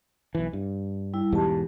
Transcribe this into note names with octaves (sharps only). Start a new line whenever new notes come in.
B1 E3
G2
G3 E4
E2 G#2 B2 G4 A5